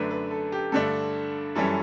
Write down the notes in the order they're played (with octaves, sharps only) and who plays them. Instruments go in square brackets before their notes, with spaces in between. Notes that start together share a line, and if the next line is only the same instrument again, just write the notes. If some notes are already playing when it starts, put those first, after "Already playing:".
Already playing: [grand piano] F#2 D3 A3 D4 B4
B4
A4
G4
G2 D3 A3 D4 A4
F#2 E3 G3 C#4 A4